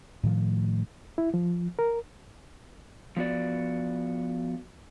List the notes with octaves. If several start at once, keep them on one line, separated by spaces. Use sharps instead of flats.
A2 D#3 F3 A3
E4
F3
A#4
F3 B3 F#4 D5